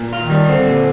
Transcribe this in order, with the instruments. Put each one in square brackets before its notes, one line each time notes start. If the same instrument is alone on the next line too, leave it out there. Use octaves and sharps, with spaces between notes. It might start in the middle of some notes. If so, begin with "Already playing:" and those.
Already playing: [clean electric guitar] A#2
F4
[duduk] D#3
[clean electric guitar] G3
[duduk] D3 [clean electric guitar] C4
[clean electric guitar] A#2